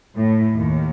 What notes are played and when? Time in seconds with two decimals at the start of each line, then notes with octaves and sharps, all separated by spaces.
0.15 A2
0.55 D#2